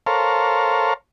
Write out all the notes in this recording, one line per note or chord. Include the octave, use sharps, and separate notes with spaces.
A4 A#4 C5 C#5 F5